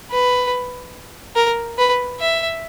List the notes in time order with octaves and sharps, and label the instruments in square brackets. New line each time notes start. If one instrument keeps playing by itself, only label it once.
[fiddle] B4
A#4
B4
E5